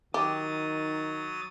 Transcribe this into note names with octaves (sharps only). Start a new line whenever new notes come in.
D#3 F#3 G4 D#6 A6